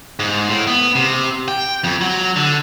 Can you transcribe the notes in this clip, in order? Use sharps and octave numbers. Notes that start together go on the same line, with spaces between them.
G#2
A2
B3
C3
G5
F2
F#3
D3